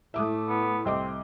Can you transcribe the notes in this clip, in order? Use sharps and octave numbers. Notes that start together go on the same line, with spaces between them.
A2 A3 E4 E5 D6 D#6
B3
C2 C4 D#5 D6